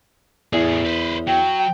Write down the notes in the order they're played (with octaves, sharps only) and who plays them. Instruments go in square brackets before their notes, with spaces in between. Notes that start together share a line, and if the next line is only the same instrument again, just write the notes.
[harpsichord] E2 [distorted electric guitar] A2 G#4
[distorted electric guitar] B4 C5
[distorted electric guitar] F#3 [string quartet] G5